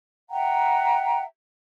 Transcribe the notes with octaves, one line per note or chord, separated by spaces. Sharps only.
E5 F#5 G5 A#5